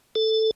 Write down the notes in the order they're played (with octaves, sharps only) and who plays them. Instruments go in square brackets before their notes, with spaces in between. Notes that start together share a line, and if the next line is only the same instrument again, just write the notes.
[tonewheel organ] A4